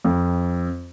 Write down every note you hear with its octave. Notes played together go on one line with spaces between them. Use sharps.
F2